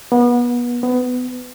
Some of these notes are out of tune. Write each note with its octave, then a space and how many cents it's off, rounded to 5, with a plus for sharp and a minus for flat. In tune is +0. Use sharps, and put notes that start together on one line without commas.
B3 -30
B3 +20